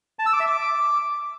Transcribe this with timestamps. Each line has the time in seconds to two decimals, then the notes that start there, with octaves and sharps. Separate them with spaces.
0.19 A5
0.26 E6
0.33 D6
0.40 E5
0.47 D6